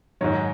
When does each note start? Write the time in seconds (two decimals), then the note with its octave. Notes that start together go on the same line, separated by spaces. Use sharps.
0.21 G#2 D#3 F#3 C#5
0.32 D#5